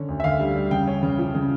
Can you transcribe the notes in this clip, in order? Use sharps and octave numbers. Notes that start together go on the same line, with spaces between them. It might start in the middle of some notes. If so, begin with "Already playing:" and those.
Already playing: D3 C#4
D2
E5
D3 F5
G3
G3
C#3 G5
C#4
C#3
F3
C#3